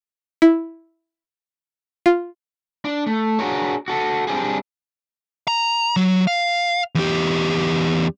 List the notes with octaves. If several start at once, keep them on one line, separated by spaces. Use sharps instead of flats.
E4
F4
D4
A3
D4 F#4 G#4 A#4 C#5
F#4 A4
G3 C4 D4 G4 G#4
A#5
F#3
F5
E2 G4